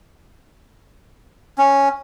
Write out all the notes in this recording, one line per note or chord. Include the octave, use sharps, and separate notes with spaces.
C#4